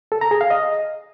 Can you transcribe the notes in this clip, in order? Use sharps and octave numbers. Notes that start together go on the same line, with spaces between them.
A4
A#5
G#4
F5
D#5